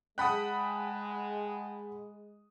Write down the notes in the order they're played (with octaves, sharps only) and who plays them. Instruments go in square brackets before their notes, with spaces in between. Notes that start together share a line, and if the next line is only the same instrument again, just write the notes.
[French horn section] G#3 [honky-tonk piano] F#5 B5 F#6 [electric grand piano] G5 A5 D#6